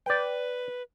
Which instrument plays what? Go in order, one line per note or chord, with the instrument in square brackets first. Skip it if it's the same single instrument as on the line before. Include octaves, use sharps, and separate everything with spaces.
[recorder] B4 [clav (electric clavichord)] D5 G5